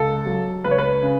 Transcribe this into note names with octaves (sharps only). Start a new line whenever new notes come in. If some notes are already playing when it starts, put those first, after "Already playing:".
Already playing: C#2 A4
F#3
C#2 B4
C#5
B4
C#3